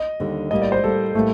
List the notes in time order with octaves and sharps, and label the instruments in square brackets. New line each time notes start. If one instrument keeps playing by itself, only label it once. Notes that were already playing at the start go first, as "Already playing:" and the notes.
Already playing: [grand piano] D#5
[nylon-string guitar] D#2 D3 G3
[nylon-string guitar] A2 G3 A#3 [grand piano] D#5
[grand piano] D5
C5
[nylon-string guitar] A2 G3 A#3 [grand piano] A4
[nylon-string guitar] A2 G3 A#3 [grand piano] A3